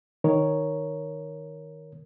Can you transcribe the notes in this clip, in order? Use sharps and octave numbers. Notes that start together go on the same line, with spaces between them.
D#3 A#4 C#5